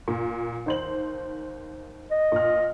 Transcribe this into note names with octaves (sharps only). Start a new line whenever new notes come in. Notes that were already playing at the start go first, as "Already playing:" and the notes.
A#2
D#2 C5 F#7
D#5
A#2 F6